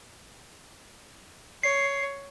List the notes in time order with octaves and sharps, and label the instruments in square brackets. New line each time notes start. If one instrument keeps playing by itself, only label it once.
[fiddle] C#5 [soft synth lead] C7